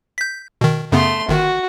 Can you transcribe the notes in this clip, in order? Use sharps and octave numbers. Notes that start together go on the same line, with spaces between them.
G6 B6
B2 D#3
F#2 C#3 A3 B3 C6
G1 D#3 F#4